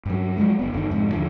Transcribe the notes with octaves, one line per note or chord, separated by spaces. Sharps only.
G2 F#3
F3 F#3 G#3 A3
F#1 B3
G1 G2 D3 D#3
F2 G#2 C3
D#2 D3 F3